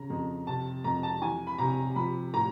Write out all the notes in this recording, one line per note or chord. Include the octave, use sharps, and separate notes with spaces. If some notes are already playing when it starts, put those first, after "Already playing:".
Already playing: C#3 A#5
F2
C3 A5
F2 A#5
A5
E3 G#5
B5
C3 A#5
F3 B5
A2 A#5